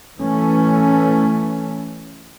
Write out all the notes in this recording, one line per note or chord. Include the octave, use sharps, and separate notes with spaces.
E3 A3 C#4